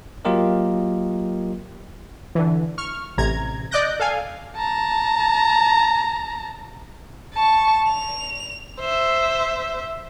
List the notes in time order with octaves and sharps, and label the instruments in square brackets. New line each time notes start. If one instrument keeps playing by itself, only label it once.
[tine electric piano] F#3 A#3 F4 G4 A#4 D#5
[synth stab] D3 E3
C#6 F6
A1 C3 A#5 G#6
D5 D#5 D6 F#6 G6 A#6
A4 F5 G#5
[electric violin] A5 A#5
[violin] A5 C#6
F7
C5 E5